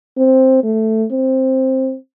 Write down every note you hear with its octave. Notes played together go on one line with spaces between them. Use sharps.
C4
A3
C4